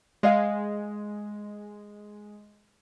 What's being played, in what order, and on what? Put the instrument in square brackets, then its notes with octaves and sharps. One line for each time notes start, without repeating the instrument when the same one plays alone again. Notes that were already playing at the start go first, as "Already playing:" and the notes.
[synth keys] G#3 [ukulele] G#4 D#5 F5